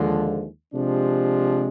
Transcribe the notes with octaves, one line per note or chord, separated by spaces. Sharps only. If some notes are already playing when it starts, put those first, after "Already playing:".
Already playing: D#2 D3 F3 G#3
C3 F3 G#3 D4 G4